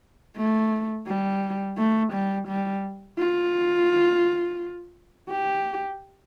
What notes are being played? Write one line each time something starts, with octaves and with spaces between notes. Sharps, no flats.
A3
G3
A3
G3
G3
F4
G4